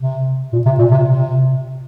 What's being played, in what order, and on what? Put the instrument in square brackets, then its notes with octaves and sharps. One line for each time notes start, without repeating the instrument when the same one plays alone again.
[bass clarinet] C3
A#2
C3
A#2
C3
C3